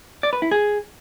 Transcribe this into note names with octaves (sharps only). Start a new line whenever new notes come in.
D5
B4
E4
G#4